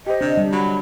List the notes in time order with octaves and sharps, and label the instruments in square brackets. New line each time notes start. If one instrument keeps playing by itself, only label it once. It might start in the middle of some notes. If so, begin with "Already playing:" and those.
[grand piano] G4 C5 [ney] D#5
[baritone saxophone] C3 [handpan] D4
[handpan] G3
[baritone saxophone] F#3 [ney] B5